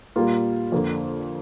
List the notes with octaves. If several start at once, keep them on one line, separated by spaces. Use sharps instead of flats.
A#2 G3 A#3 F4
F2 D3 A#3